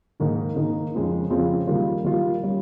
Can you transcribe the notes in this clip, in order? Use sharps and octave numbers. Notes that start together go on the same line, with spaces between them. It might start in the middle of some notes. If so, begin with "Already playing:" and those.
G#2 D#3 A#3 D#4
G#2 D#3 A#3 D#4
F2 C#3 G#3 C4 F4
F2 C#3 G#3 C4 F4
D#3 G3 A#3 F4
D#3 G3 A#3 F4
G3 C#4